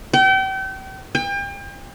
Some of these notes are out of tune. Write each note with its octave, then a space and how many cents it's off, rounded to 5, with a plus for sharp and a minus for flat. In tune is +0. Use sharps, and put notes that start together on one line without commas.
G5 -35
G5 +35